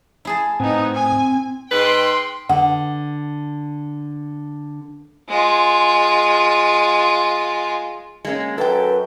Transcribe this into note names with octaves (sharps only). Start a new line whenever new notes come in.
E4 G#4 A5
A2 B3 C4 D#4 D#6 G#6
G#5
G#2 G#3 B4 G5 C6
D3 F#5
G#3 F4
G#3 A#3 C#4
F#2 A4 B4 G5